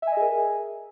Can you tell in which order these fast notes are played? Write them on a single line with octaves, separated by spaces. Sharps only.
E5 G#5 D#5 G#4 A#4